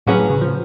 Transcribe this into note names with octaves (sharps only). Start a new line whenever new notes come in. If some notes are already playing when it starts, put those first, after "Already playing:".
A2 F#3 C#4 G#4 B4
A2
C#3
F3